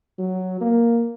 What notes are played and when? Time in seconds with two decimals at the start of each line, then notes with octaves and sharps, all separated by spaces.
0.19 F#3
0.61 A#3